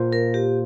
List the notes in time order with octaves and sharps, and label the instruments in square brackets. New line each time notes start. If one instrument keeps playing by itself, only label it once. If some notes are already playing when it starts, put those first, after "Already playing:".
Already playing: [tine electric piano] A#2 A#3 F4 C5
[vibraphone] A#4
G4